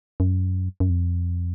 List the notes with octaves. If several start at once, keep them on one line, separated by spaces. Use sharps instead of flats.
F#2
F#2
F2